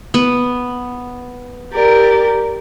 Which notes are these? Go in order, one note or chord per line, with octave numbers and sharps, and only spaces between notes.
B3
G4 A#4 D5